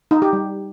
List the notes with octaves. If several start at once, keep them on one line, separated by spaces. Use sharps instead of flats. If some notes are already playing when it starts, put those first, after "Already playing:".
D#4
G4
G3